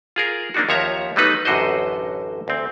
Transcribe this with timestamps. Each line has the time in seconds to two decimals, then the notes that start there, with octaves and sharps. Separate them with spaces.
0.16 F4 G#4 A#4
0.54 A#3 C4 D4 D#4 F#4
0.69 D#2 F3 C#5 E5 A#5
1.16 F#3 G3 A3 B3 D#4 B4
1.45 A1 F#2 D3 F#4 C5 D#5
2.48 D2 C4